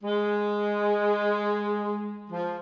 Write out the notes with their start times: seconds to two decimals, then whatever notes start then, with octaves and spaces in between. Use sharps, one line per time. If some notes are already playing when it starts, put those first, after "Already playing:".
0.03 G#3
2.31 F3